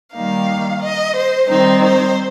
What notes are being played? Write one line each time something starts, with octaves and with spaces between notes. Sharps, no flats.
D#3 G3 A#3 D#4 F5
D#5
C5
D#3 G3 C4 D#4 C5
C5